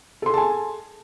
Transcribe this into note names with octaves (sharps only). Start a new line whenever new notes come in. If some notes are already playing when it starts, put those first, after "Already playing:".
G#4 A4 G#5 A5 C6